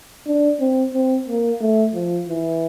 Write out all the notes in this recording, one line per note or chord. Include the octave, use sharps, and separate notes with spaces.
D4
C4
C4
A#3
A3
F3
E3